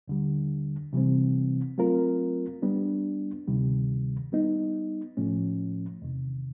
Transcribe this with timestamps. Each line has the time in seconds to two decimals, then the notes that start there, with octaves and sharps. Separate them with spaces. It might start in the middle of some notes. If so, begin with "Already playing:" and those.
0.08 D#2 D3 G3
0.93 C3 E3 G3 C4
1.78 F#3 A3 C4 F4 A#4
2.62 G3 B3 D4
3.47 D2 C3 D#3 G3
4.32 G3 B3 D#4
5.17 A2 F3 A3 C#4
6.02 E2 C3 D#3